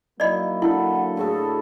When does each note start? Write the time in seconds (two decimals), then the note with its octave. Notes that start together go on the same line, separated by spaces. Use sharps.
0.20 F#3 A#3 D#4 E4 D5 D#5
0.62 D3 E4 A4 F#5 B5
1.17 A2 F#4 G#4 A4